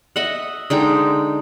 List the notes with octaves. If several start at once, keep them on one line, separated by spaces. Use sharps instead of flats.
D#5 E5 F#5
D3 G#3 D#4 G5